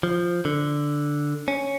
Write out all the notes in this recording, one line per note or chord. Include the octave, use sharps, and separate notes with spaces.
F3
D3
C#4